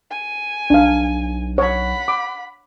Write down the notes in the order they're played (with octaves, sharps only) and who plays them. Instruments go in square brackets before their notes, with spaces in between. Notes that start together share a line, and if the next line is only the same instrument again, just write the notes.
[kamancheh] G#5
[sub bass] B1 [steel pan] D4 F5
[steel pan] C#5 [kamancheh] F#5 B5
[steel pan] D6